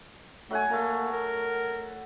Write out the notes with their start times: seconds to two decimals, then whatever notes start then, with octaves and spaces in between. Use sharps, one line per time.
0.51 F#3 A3 F#5 G#5
0.70 A3 A#3 A#5
1.12 A#4